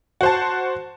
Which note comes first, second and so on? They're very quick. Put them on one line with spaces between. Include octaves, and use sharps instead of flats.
F#4 C5 A5